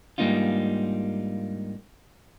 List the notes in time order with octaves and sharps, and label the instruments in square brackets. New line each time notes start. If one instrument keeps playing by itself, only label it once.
[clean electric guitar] G#2 G3 A#3 D4 D#4 F4